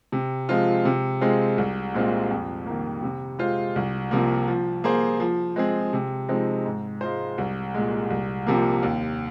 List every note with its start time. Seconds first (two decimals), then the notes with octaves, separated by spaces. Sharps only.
0.12 C3
0.49 F3 G#3 C4 F4
0.85 C3
1.21 G#3 C4 F4 G#4
1.58 C2
1.94 A#2 G#3 C4 F4
2.31 F2
2.66 D#3 A#3
3.03 C3
3.39 G#3 F4 C5
3.76 C2
4.11 C3 F3 A#3
4.48 F3
4.84 A#3 G#4 C5
5.20 F3
5.56 G#3 C4 G#4
5.93 C3
6.29 F3 G#3 C4 D#4
6.66 G#2
7.01 G#3 F4 C5
7.38 C2
7.74 A#2 G#3
8.10 C2
8.47 C3 F3 A#3
8.83 D#2